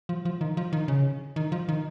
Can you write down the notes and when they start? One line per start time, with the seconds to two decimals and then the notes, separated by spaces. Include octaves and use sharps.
0.09 F3
0.25 F3
0.41 D#3
0.57 F3
0.73 D#3
0.88 C#3
1.36 D#3
1.52 F3
1.69 D#3